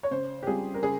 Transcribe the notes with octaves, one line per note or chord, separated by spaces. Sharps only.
C#5
C#3 C5
G4
G3 C4 F4 G#4
A#4
C#3 G#4